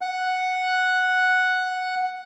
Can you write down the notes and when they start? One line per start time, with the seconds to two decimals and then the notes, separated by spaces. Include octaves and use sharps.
0.01 F#5 F#6